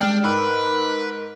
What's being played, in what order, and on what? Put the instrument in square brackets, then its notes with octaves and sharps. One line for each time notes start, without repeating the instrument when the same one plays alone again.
[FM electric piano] G3 G#3 [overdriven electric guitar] D4 [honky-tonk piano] G5 F6
[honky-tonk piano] G#2 [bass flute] A#4 [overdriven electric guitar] B4 [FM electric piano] D6 E6